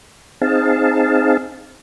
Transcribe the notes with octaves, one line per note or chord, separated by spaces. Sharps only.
C4 D#4 G#4 F5 A5